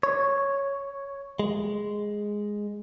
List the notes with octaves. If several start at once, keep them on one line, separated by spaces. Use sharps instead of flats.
C#5
G#3